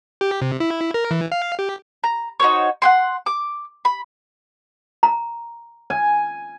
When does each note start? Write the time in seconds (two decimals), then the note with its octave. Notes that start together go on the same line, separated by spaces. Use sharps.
0.21 G4
0.42 C3
0.60 E4
0.94 A#4
1.11 E3
1.32 F5
1.59 G4
2.04 A#5
2.40 D#4 F#4 C5 C#5
2.82 F#5 G5 C6
3.26 D6
3.85 B5
5.03 A#5
5.90 G#5